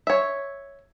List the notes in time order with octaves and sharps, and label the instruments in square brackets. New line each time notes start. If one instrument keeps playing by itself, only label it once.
[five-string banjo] C#5 E5